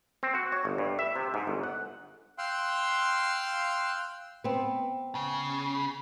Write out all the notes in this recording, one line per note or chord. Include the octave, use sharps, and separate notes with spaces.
C4
F#4
C#5
G1
G2
E5
C3
G#2
G1
F#5
F5 G5 C6 E6 F#6
B3 C4
C#3